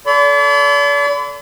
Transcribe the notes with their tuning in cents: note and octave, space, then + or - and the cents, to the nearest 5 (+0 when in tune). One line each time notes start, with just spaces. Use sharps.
A4 +0 D5 -40 B5 +40